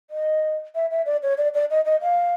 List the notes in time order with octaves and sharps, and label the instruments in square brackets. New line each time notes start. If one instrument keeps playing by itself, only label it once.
[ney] D#5
E5
E5
D5
C#5
D5
D5
D#5
D#5
F5